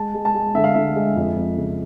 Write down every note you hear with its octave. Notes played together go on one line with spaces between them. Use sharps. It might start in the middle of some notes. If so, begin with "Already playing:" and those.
Already playing: G#3 A5
G#3
A5
G#3
D3 E5
F5
D3 E5
G#3
F2
F2
C#3